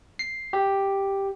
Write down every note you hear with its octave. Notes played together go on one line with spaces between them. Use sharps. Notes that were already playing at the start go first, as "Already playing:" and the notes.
C7
G4